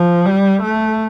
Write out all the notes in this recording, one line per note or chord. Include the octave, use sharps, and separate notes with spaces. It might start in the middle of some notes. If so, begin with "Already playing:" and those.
Already playing: F3
G3
A3